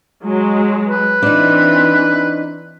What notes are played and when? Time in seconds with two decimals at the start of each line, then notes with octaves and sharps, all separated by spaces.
0.22 F#3 G#3
0.88 B4
1.22 E3 C4 D4 D#4